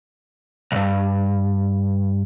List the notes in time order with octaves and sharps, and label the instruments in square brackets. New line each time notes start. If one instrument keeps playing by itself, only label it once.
[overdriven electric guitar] B1 G2